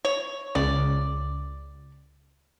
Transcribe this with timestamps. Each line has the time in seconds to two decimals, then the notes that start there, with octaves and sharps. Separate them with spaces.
0.05 C#5
0.55 C#2 C#3 D5